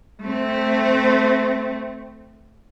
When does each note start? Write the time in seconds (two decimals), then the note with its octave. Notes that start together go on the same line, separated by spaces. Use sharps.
0.23 A3 C4